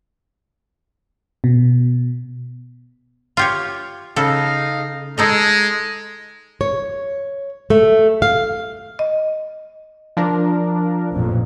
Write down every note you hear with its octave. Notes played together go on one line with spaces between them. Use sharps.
B2
F4 G4 C#5
C#3 D#4 A4 F5
G#3 D#4 A4 D#5
C#5
A3
F5
D#5
F3 D4 A#4
A1 F2 A#2